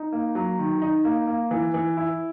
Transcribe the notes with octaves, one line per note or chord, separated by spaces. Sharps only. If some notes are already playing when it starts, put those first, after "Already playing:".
Already playing: D#4
A#3
F#3
D#3
D#4
A#3
A#3
E3
E3
E4